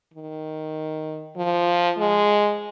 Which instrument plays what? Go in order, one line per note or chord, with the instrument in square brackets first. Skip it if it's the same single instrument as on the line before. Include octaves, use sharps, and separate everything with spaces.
[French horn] D#3
F3
G#3